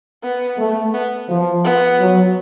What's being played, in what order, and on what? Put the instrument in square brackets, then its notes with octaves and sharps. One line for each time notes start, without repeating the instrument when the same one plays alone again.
[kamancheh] B3
[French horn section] A3
[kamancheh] B3
[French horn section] F3
[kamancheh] B3
[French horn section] F#3